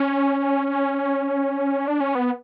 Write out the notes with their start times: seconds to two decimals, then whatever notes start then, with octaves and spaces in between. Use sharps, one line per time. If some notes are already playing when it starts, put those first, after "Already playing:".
Already playing: C#4
1.88 D4
2.00 C#4
2.15 B3